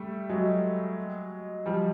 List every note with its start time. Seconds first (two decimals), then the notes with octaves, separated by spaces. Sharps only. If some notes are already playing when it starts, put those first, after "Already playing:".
Already playing: G3 A3
0.29 F#3 G#3
1.66 F3 G3